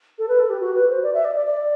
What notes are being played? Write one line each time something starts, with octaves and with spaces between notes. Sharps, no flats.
A4
B4
A4
G4
F#4
B4
C5
D5
E5
D5
D5
D5